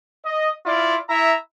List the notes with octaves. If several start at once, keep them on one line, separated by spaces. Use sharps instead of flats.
D#5
E4 F4 D5
E4 E5 A#5